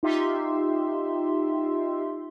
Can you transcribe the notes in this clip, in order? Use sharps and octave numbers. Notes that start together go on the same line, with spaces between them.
D#4 F4 G4 E5 C6